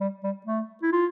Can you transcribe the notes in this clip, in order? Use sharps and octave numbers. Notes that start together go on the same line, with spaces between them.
G3
G3
A3
E4
F4